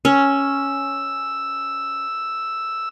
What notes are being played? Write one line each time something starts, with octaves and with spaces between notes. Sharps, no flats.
C#4 E6